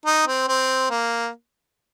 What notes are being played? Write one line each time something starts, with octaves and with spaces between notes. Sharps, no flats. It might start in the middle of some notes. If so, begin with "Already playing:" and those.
D#4
C4
C4
A#3